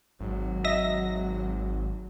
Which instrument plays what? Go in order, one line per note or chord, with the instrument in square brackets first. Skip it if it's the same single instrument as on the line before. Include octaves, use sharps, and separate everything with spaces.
[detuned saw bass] G#1 [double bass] F#3
[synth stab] D#5 E5 A#6